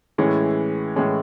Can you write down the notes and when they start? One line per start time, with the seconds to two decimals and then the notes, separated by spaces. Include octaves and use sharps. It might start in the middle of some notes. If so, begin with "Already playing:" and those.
0.18 A2 E3 G#3 C#4
0.96 A2 E3 G#3 C#4